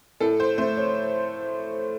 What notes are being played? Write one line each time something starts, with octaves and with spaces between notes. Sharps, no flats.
A2 A4
C5
A3 C5
C#5